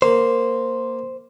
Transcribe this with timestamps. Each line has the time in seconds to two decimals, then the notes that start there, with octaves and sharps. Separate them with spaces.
0.02 A#3 C5